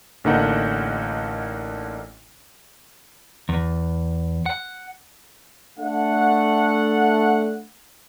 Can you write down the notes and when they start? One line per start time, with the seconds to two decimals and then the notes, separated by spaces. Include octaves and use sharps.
0.24 A1 D3 A#3 D#4 F#5
3.49 E2
4.46 F#5
5.78 A3 D4 F#5